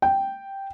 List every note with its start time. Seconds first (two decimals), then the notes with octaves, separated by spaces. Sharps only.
0.02 G5